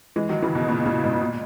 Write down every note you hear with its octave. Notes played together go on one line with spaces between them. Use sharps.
E3 G#3
D#3 F#3
C#3 E3
B2 D#3
A#2 C#3
A#2 C#3
G#2 B2
A#2